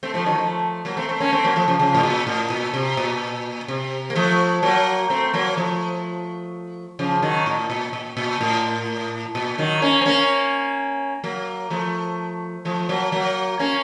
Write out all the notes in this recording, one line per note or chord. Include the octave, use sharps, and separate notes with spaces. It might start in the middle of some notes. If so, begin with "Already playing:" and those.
A3 C4
F3 A3
D#3 F#3
F3 A3
F#3 A#3
A3 C4
A3 C4
A#3 C#4
A3 C4
F#3 A#3
F3 A3
C#3 F3
C#3 F3
A2
A#2
A2
A#2
C3
A#2
C3
A#3
F3 A3
F#3 A#3
A3 C4
F#3 A#3
F3 A3
C#3 F3
D#3 F#3
A2
A#2
A#2
A#2
A2
A#2
D#3 F#3
A#3 C#4
C4
A#3 C#4
F#3 A#3
F3 A3
F3 A3
F#3 A#3
F#3 A#3
A#3 C#4